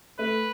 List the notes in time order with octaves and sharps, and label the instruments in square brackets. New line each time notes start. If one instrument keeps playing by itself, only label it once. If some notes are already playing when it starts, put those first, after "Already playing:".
[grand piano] A3 [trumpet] B4